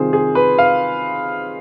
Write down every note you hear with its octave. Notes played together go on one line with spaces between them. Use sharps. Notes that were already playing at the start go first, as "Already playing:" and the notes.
Already playing: C3 D#3 G3 C4 F4 G#4 C5
G#4
B4
F5